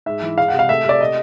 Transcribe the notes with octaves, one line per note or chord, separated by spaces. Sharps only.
G#2 E5
E3
G#3 F5
F#5
C3
F5
A3 E5
C3 D5
D#5